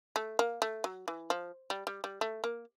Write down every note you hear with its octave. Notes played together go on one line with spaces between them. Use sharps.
A3
A#3
A3
F#3
E3
F3
G3
G3
G3
A3
A#3